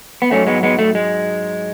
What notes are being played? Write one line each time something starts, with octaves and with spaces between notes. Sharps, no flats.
B3
G#2 F#3 A3 C#4
G#3 B3
G#3 B3
A3
G#3